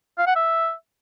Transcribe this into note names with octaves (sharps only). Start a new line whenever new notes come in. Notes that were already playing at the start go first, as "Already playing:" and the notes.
F5
F#5
E5